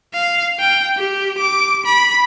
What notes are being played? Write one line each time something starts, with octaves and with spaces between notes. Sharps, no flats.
F5
G5
G4
D6
B5